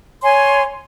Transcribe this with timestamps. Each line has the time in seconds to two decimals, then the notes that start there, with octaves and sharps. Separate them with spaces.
0.22 C#5 G#5 C6